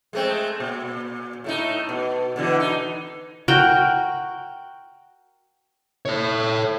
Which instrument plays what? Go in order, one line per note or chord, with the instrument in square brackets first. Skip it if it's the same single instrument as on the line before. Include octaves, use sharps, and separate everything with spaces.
[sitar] G#3 A3 C4
A#2
A2 A3 D#4
B2
B2 D3 E3
D#4
[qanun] F#4 A#4 G5
[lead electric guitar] A4 C#5